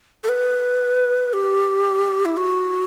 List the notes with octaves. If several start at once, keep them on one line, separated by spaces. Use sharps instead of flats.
A4
B4
G4
E4
F#4